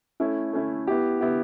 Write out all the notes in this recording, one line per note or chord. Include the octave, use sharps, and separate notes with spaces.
A3 C#4 E4
A3 C#4 E4
B3 E4 G4
B3 E4 G4